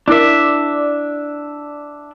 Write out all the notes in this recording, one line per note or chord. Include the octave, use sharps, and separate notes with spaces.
D4 E4 A#4 E5